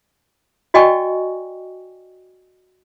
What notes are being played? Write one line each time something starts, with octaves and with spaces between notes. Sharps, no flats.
F#4 D5 D#5 G5 G#5 C#6